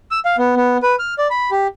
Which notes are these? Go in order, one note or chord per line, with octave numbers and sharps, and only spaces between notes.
E6
F5
B3
B3
B4
F6
D5
B5
G4